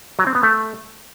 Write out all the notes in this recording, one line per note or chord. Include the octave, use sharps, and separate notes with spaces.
F#3
C4
B3
A3